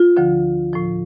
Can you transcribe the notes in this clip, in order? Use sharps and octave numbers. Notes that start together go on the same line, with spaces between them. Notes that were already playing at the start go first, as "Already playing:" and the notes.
Already playing: F4
D2 D3 F3
A2 F3